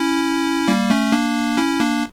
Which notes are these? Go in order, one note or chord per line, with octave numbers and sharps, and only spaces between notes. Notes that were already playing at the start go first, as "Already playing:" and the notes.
Already playing: C#4 E4
G3 A#3
A3 C#4
A#3 D4
C#4 E4
A#3 D4